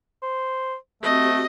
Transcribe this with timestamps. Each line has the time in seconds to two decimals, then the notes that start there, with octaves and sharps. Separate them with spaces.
0.22 C5
1.03 A3 C4 F#4 G4 D#5